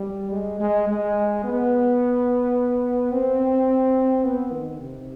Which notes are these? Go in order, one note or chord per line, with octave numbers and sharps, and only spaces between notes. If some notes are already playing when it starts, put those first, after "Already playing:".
Already playing: G3
G#3
G#3
G#3
B3
C4
B3
D#3
C3